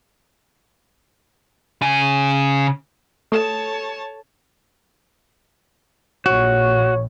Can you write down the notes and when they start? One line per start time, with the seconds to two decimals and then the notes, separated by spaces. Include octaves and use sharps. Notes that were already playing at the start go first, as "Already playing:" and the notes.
1.82 C#3 G#5
3.32 A3 A4 C#5 A5 E7
6.26 A#1 F#4 C#5